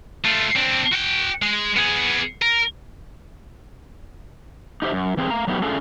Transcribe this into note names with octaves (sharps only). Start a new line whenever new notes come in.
A3 F4
C4 D4
F#4 G5
G#3
B3 G#4
A#4
D#4 G4 C5 E5
F#2
E3 C4 G#4 C5
A3 F5 A#5
F#3 A3 B3 D#4 G4
A3 C#4 D4 F4 G#4 A4